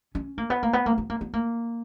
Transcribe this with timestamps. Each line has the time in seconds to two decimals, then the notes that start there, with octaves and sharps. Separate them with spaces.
0.15 C#4
0.38 A#3
0.50 B3
0.63 A#3
0.73 B3
0.86 A#3
0.98 B3
1.10 A#3
1.21 B3
1.33 A#3